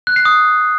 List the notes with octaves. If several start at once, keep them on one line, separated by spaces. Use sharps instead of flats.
F#6
C7
D#6